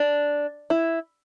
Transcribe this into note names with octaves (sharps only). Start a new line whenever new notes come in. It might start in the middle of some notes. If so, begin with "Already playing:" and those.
Already playing: D4
E4